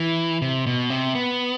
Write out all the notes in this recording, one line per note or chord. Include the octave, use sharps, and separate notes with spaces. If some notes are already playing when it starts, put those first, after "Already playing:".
Already playing: E3
C3
B2
C3
B3